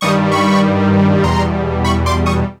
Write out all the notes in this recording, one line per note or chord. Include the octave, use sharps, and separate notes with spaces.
G2 D#3 G3 C#6 D#6
B5 C#6
E2 B2 G3 A#5 C6
B5 C#6
C6 D6
C#6 D#6